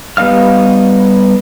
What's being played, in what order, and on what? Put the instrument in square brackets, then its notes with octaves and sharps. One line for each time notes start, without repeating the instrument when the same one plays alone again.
[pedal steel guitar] G3 B3 D#4 F5 F6